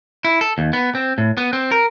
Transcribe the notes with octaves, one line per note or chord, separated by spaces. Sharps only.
E4
A4
D#2
B3
C4
A2
B3
C4
A#4